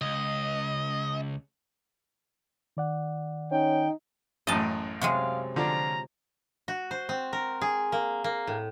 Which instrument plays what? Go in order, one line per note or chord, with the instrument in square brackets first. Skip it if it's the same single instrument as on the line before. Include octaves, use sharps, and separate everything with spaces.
[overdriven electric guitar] C#2 [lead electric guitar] D#5
[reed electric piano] D#3 D5 F#5
[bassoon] C#4 [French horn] D#4 [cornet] G5
[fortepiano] A1 F#2 A2 [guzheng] D#5 A5
[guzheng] C3 F#3 G#3 [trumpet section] F5
[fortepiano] D3 F3 D4 [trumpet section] C#4 A#5
[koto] F#4
C5
C4
A#4
G#4
A#3
A#3
A2